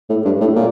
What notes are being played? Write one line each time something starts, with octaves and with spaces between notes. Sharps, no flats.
A2
G2
A2
A#2